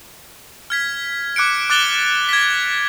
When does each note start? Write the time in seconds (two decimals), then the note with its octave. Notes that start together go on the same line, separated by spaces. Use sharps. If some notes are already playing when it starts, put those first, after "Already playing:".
0.70 F6 G#6 B6
1.36 D6 F#6 C#7 D7
1.70 D6 F#6 A6 F7 G7
2.29 G#6 B6